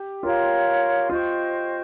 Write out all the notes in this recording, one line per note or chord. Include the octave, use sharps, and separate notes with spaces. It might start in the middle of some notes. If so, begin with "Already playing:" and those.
Already playing: G4
F4 A#4 C#5 F5 C6
F4 C5 D#5 G5 C#6